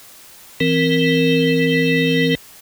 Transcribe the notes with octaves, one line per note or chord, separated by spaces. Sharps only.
E3 C4 A#4